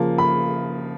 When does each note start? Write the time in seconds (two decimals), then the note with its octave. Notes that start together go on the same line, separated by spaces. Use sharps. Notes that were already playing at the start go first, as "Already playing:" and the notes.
Already playing: C#3 F3 A#3
0.18 B5